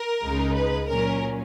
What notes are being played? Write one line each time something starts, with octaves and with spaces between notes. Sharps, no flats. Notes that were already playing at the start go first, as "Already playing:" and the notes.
Already playing: A#4
C#2 C#3 G#3 D#4
B4
A#2 F#3 C#4 A#4